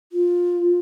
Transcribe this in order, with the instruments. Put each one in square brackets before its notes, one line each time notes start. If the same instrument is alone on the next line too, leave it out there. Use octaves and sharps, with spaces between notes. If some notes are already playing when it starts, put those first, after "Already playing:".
[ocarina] F4